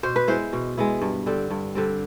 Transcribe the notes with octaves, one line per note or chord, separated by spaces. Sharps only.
B2 C5
B4
G#3 B3 E4 C5
B2
G#3 B3 E4
G2
D3 G3 C4
G2
D3 G3 C4